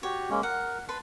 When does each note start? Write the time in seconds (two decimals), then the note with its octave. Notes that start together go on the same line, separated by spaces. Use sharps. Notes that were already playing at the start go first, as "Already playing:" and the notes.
0.03 F#4 G4 C#5
0.30 G#3 A#3 C#4
0.43 A#4 F#5
0.89 B4 A5 C6